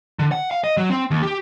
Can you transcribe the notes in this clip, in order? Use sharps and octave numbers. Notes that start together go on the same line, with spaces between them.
D3
F#5
F5
D#5
F#3
C4
D#2
G4